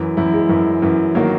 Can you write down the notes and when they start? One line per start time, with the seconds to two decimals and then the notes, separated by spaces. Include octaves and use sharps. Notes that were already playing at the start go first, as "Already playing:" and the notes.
Already playing: F#2 E3
0.17 F#2 E3 E4
0.33 G#3
0.49 F#2 E3
0.82 F#2 E3
1.15 D#3 F#3 A#3